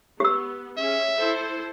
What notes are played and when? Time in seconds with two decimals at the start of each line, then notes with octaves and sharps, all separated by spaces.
0.20 B3 G4 E6
0.77 C#4 G#4 E5
1.16 E4 A4 C5